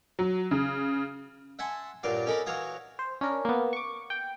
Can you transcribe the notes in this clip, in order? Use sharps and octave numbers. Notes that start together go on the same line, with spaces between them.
F#3
C#3
E5 F#5 G#5 A5 C6
G2 A#2 F#3 D4 D5 F5
C#4 D#4 A4 A#4 B5 D6
E3 F#3 C#5 F5 A#5 D#6
C5
C#4 D4 A#4
A#3 B3
C#6 D6
G5